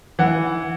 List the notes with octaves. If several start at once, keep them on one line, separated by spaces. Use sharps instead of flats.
E3 F#5